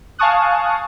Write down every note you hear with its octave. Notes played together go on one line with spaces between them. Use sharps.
F5 G#5 A5 C#6 D#6 F#6